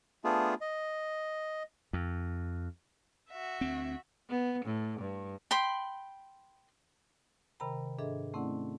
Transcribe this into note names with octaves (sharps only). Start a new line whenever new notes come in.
A3 B3 D4 F4 G#4
D#5
F2
F#4 E5
D2 C4
B3
A2
G2
G5 B5 C6
C3 D#3 A#4 G5 A#5 B5
G#2 D4 G#4 A4 D#5 E5
A3 C4 C#4 E4 D5 F#5